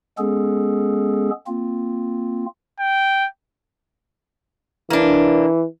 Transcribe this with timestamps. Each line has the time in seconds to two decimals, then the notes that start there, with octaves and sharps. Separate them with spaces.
0.18 G#3 B3 C#4 G#4 A4
1.47 A#3 C4 F4
2.80 G5
4.90 E3 A#3 D4